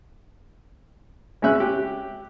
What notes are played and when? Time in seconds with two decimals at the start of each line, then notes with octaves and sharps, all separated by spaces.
1.42 G#3 C#4 E5 F#6
1.60 G4